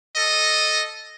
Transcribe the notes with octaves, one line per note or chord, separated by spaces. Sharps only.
A4 D#5